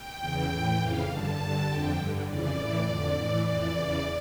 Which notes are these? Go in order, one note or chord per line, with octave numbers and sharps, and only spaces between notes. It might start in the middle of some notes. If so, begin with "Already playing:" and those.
Already playing: G5
E2 C#3 E3
A2 E3
F2 C#3 E3 F5
G2 D3 A5
G2 D3
F2 D3 G5
G2 D3
F2 C#3 E3 D5
A2 E3
F2 D3
A2 E3
F2 E3 D5
E2 C#3 E3